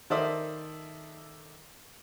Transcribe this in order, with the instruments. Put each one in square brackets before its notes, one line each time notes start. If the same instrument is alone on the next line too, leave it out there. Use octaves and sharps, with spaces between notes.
[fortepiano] D#3 A4 C5 D5 E5 D#6